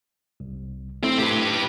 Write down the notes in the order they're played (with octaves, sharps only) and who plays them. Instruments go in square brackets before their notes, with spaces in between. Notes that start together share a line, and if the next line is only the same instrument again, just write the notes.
[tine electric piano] C2
[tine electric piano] A3 E4 [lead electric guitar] C4
[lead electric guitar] G4 B4